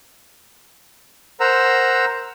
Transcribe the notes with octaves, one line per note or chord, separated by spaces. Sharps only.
A#4 C5 F#5 A#5 E6